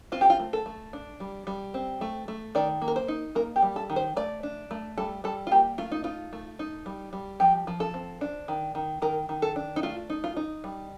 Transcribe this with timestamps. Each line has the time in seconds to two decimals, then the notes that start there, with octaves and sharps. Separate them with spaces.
0.12 C4 F4
0.21 G4
0.30 F4
0.40 A3
0.53 A4
0.66 A3
0.93 D4
1.20 G3
1.47 G3
1.74 C4
2.01 A3
2.28 A3
2.55 D#3 D5
2.82 A#3
2.88 A#4
2.96 C5
3.08 D#4
3.35 A#3 A#4
3.56 G4
3.62 G3
3.76 A4
3.90 D#3
3.96 C5
4.16 A3 D5
4.43 D4
4.71 A3
4.98 G3 A4
5.24 G3 A4
5.47 F4
5.52 A#3 G4
5.78 A3 F4
5.92 D#4
6.04 D#4 F4
6.33 A3
6.59 D#4
6.86 G3
7.13 G3
7.40 F3 G4
7.67 F3
7.80 A4
7.94 C4
8.21 D4
8.48 D#3
8.75 D#3
9.02 D#3 A#4
9.29 D#3
9.42 A4
9.56 D4
9.76 D#4
9.83 A3 F4
10.10 D#4
10.24 F4
10.37 D#4
10.64 G3